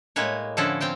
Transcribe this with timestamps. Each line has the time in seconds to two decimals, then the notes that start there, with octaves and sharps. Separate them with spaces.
0.16 A2 G#3 A#3 B4 C#5
0.57 D3 F3 C#4 E4 A4 F#5
0.81 C4 F5 G5 A5